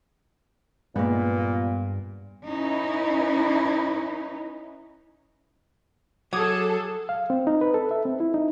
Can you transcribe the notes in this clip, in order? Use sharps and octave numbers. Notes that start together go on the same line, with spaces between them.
G2 A#2 G#3 A#3 B3
C#4 D#4 E4 B4
F#3 G#4 A4 D6 D#6 G#6
F5
C4
D#4
B4
A4
E5
C4
E4
D#4